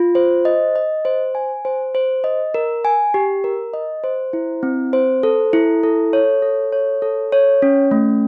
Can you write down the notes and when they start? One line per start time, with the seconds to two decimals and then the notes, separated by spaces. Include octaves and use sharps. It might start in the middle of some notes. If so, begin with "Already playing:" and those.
Already playing: F4
0.15 C5
0.45 D#5
0.76 D#5
1.05 C5
1.35 G#5
1.65 C5
1.95 C5
2.24 D#5
2.54 A#4
2.85 G#5
3.14 G4
3.44 A#4
3.74 D#5
4.04 C5
4.33 E4
4.63 C4
4.93 C5
5.23 A4
5.53 E4
5.83 A4
6.13 C#5
6.42 A4
6.72 C#5
7.02 A4
7.32 C#5
7.62 C#4
7.91 A3